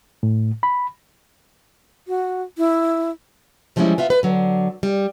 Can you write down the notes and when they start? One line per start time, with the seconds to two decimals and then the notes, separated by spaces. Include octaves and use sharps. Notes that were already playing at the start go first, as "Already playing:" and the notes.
0.23 A2
0.63 B5
2.08 F#4
2.58 E4
3.76 E3 F3 G3 G#3 C#4 E4
3.98 B3 F4 E5
4.10 B4
4.23 D3 F#3
4.83 G3